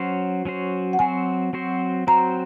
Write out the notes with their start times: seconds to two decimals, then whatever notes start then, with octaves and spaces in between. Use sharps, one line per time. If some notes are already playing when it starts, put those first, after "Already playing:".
Already playing: F#3 C#4 F#4 C5
0.45 F#3 C#4 F#4 C5
0.93 F#5
0.99 F#3 C4 F#4 C5 G#5
1.53 F#3 C4 F#4 C5
2.07 F#3 C4 F#4 C5 A#5